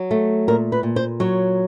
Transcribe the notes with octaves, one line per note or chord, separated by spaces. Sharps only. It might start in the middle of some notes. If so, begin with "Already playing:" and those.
Already playing: F#3
A3
A#2 A#4
B4
A#2
C5
F#3 C#5